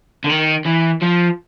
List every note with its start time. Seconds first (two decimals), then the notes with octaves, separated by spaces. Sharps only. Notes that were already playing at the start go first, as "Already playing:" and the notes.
0.24 D3
0.29 D#3
0.65 E3
1.02 F3